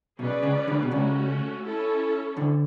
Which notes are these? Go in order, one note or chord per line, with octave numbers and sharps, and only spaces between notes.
B1 B2 C#4 G#4 B4 D5
C#2 C#3
D2 D3
B2
C#2 C#3 A3 C#4 F#4
C#4 E4 A4
D2 D3